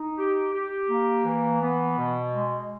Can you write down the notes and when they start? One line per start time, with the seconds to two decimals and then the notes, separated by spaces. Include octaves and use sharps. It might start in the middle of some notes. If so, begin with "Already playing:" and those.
Already playing: D#4
0.17 G4
0.53 G4
0.89 A#3
1.25 E3
1.62 B3
1.98 B2
2.34 G#3